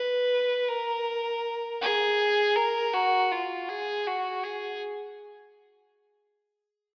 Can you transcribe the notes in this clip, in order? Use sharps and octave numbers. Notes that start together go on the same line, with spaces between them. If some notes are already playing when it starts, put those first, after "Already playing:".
Already playing: B4
A#4
G#4
A#4
F#4
F4
G#4
F#4
G#4